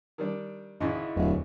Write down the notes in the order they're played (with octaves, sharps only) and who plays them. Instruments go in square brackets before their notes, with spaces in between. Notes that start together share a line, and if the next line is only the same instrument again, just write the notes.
[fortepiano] D#3 G3 D4
[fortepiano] G#1 G#2 C#3 [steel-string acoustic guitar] E4 D#5
[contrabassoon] D1 [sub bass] E2